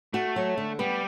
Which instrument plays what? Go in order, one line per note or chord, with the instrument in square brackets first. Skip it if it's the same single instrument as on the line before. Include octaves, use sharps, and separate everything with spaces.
[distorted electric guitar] A3 [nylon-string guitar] F#4
[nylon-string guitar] F#3
D3
[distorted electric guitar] G3 [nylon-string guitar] B3